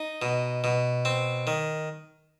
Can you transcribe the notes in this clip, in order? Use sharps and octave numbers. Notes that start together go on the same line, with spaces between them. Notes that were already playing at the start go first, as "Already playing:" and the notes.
Already playing: D#4
B2
B2
C4
D#3